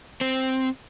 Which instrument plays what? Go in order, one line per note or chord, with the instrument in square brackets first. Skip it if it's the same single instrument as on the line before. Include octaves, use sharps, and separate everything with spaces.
[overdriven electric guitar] C4